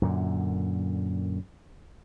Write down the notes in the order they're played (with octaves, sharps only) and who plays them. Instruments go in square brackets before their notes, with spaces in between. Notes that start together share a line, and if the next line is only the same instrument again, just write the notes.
[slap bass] F#2 A#2 D3